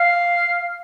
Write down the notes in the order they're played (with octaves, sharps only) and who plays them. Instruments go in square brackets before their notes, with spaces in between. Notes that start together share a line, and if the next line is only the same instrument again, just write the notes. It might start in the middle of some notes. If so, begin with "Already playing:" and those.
Already playing: [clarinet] F5